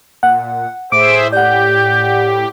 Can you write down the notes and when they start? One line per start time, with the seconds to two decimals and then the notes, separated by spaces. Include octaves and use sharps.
0.23 A#2 F#5
0.92 A2 G#4 C5 E5 D6 D7
1.32 G4 D5 F#5 G6